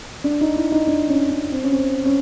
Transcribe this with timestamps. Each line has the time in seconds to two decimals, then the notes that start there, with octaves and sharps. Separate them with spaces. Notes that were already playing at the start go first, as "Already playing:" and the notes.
0.24 D4
0.41 D#4
0.56 E4
0.72 D#4
0.87 D4
1.09 C#4
1.30 C#4
1.52 C4
1.63 C#4
1.72 C4
2.05 C#4